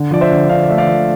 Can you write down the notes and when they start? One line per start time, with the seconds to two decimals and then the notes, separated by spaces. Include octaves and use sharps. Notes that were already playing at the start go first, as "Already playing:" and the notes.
Already playing: D3
0.11 F3 D5
0.21 C5 E5
0.31 D3
0.49 D3 D5 F5
0.63 D5
0.68 A3 E5
0.78 D5 F5
0.87 F3